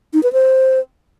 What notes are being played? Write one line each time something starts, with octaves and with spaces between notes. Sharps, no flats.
D#4
B4
C5